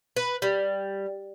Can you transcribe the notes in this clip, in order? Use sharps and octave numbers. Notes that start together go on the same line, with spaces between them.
B4
G3